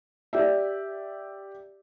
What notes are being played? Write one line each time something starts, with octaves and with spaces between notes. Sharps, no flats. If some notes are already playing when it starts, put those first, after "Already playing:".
G4 D5 E5